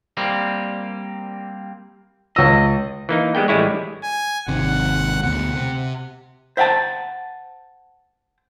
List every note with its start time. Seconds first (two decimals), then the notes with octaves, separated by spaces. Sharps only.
0.17 G3 A#3 C4
2.36 C#2 D#5 E6
3.09 E3 A#3 D#4
3.35 G3 G#3 B3 G5
3.48 A1 G3 G#3 E4 C#5
4.03 G#5
4.48 G#1 C3 D#3 F#5
5.23 D2 B2 F#5
5.55 C3
6.57 C5 E5 F#5 G5 A5